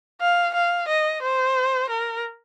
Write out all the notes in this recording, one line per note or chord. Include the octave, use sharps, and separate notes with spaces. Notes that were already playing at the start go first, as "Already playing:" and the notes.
F5
F5
D#5
C5
A#4